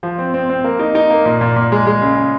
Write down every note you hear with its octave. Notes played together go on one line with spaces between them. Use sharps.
F3
C4
C4
C4
A#3
D#4
D#4
A#3
A#2
A#2
A#2
G#3
G#3
C#3
C#3